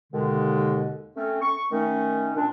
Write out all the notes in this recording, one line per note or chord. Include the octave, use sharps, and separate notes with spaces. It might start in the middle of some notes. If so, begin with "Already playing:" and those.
D#2 B2 D3 G#3
A3 C4 C#4
C#6
D#3 A3 C#4
A#2 D4